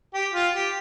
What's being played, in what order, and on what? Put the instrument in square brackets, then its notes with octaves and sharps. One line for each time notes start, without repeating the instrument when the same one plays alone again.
[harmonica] G4
F4
G4